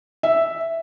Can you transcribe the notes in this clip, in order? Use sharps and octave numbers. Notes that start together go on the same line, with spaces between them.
E5